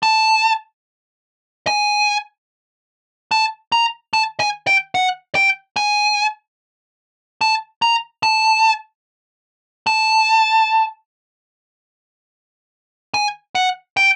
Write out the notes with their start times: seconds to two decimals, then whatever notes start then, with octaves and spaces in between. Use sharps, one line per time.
0.03 A5
1.67 G#5
3.31 A5
3.72 A#5
4.13 A5
4.40 G#5
4.67 G5
4.95 F#5
5.35 G5
5.76 G#5
7.41 A5
7.82 A#5
8.23 A5
9.87 A5
13.14 G#5
13.55 F#5
13.97 G5